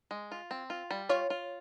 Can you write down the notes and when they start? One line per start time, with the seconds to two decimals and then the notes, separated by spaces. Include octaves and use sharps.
0.11 G#3
0.32 F4
0.51 C4
0.70 F4
0.91 G3
1.09 F4 C#5
1.30 F4